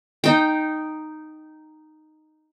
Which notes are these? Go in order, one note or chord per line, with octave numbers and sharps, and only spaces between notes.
D#4 G5